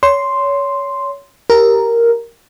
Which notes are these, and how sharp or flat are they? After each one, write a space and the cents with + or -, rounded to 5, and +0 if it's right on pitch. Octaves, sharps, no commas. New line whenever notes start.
C#5 +25 C6 +0
G4 -5 A#4 +0